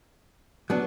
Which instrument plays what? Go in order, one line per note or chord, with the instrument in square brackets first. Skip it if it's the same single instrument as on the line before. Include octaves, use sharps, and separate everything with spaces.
[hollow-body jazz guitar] F#3 B3 D4